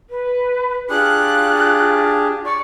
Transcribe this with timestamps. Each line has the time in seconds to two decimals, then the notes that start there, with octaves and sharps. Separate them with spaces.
0.10 B4
0.90 D4 F4 G4 G#4 F#6
2.45 D5 C#6